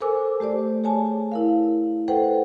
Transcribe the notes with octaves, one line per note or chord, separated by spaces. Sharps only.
A4 A#4 C5 G#5 D6 E6
A3 G4 C5 D5
G#4 C#5 G#5 A5
E4 A#4 F5
A4 B4 C5 F#5 G5